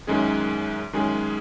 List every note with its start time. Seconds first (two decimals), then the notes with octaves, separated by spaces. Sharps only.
0.07 F#2 D#3 G#3 C#4 G#4
0.93 F#2 D#3 G#3 C#4 G#4